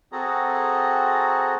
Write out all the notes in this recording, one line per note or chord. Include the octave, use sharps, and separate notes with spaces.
C4 F#4 G#4 A4 A#5